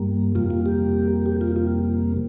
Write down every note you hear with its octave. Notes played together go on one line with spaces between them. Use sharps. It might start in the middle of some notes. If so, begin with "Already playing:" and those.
Already playing: G2 G3 A#3
F2 C3 G3 A#3 F4
F4
G4
G4
F4
F4